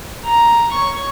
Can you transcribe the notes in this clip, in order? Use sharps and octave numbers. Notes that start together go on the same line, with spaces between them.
A#5
C#5 C#6